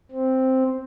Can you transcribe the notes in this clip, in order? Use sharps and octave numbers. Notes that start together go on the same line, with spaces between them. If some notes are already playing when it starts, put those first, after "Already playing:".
C4